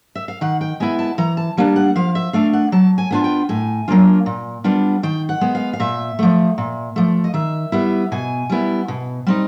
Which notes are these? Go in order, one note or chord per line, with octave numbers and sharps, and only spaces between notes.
E5
F5
D#3 F#5
G5
G#3 B3 E4 G#5
A5
E3 A#5
A5
G3 A#3 D4
F#5
F3 F5
E5
A3 D4 F5
F#5
F#3 A5
G#5
B3 D4 F4 G#5
G5
A2 G#5
F#3 A#3 D4 F4
A#2
G3 B3 D4 F4
D#3 G5
F#5
G#3 B3
F5
F5
A#2 E5
F3 A3
A#2
F3 A3
D#5
D#3 E5
G3 B3 E4
B2 G#5
G3 B3 E4
B2
G3 C4 D#4